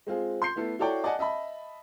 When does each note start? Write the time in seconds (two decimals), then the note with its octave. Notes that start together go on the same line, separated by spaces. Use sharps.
0.07 G#3 C4 F4 G#4
0.42 C6 G6 C7
0.56 A3 B3 E4 A4
0.79 E4 F#4 A4 C#5 D5 G5
1.04 D5 D#5 F#5 G#5 A5
1.19 D#5 E5 A5 B5